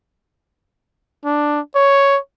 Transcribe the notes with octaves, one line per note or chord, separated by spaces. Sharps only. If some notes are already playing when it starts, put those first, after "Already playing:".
D4
C#5